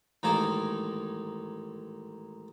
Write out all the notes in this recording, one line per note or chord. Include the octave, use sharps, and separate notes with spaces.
A1 G#2 D#3 A#3 D#4 A5